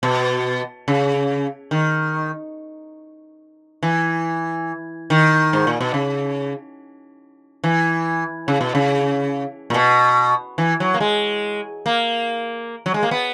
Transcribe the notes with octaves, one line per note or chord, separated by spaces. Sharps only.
B2
C#3
D#3
E3
D#3
G#2
A#2
B2
C#3
E3
C#3
B2
C#3
A#2
B2
E3
F#3
A#3
G#3
A#3
F#3
G#3
A#3
B3